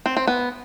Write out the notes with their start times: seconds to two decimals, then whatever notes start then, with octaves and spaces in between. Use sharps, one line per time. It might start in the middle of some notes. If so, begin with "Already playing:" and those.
0.06 C4
0.17 C4
0.28 B3